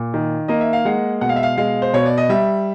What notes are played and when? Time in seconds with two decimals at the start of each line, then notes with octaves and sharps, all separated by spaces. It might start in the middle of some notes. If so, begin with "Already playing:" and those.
Already playing: A#2
0.14 D#3
0.48 A#3 D#5
0.61 E5
0.73 F5
0.85 G#3 F#5
1.21 B2 F#5
1.29 F5
1.36 E5
1.43 F5
1.58 G#3 F5
1.82 C5
1.93 B2 C#5
2.06 D5
2.18 D#5
2.29 G3 E5